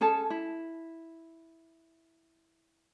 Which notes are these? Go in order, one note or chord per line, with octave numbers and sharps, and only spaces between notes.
C#4 G#4 A4 A5
E4